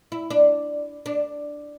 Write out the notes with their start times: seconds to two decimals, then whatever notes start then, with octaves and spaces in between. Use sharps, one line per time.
0.12 E4
0.30 D4
1.06 D4